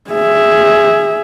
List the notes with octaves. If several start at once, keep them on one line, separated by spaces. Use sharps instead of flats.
G#4 E5